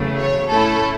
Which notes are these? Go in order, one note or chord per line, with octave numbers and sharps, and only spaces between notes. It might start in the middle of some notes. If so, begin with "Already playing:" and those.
Already playing: E2 C#3 F#3 A3
C#5
A2 A3 C#4 E4 A4